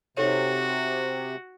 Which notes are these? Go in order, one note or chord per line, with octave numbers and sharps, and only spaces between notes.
C3 D#4 F#4 A4 C#5